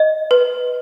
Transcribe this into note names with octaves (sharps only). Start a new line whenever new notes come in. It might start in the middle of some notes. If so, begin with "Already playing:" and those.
Already playing: D#5
B4